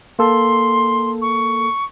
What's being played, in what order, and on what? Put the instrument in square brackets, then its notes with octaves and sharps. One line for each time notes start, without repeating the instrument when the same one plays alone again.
[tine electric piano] A#3 A4 [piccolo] C6
[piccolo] C#6